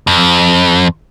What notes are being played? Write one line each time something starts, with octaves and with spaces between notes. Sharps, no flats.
F2